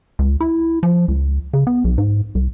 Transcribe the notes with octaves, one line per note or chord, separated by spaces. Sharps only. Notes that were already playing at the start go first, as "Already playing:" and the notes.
C#2
E4
F3
C#2
C#3
B3
B1
G#2
C2